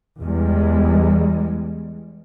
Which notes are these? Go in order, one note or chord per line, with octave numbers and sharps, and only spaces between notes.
E2 G3 G#3